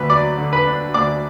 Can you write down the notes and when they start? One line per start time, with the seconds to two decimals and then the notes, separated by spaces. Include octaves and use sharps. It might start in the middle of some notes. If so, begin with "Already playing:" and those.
Already playing: D2 D4 B4
0.10 F#3 D5 D6
0.38 D3
0.53 B4 B5
0.66 D4
0.94 D2 D5 D6